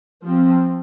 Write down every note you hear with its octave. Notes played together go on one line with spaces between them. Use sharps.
F3 C4